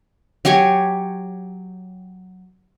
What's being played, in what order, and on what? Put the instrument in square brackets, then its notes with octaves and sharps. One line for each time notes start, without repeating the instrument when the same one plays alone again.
[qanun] F#3 G4 C#5 G#5